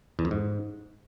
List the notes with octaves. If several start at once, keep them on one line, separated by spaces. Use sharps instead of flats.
E2
F2
G#2